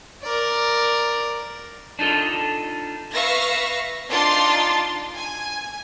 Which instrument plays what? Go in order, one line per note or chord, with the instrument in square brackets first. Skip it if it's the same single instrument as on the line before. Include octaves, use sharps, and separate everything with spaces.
[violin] A#4 D5
[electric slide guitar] D4 D#4 F4 A4
[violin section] B4 E5 F5 C#6 A#6
D4 D#4 F4 C6 A6
G#5